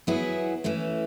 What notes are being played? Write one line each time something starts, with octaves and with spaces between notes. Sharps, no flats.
F#3 B3 E4 G#4
E3 A3 C#4